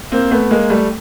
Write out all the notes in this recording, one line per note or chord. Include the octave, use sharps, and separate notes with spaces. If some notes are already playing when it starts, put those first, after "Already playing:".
A#3 C4
A3 B3
G#3 A#3
G3 A3